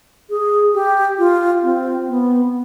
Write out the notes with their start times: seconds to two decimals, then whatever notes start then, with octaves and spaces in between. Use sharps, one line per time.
0.30 G#4
0.74 G4
1.18 F4
1.63 C4
2.08 B3